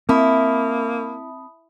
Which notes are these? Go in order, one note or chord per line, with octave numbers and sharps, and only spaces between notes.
A#3 C4 E4 A5 B5 D#6